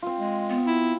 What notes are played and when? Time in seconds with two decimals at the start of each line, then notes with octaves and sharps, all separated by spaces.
0.02 C4 F4
0.19 G#3
0.50 B3
0.67 E4